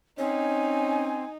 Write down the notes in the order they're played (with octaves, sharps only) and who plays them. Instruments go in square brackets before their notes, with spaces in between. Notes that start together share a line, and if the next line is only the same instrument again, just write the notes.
[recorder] C4 [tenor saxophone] C#4 [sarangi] D#4 [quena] G#5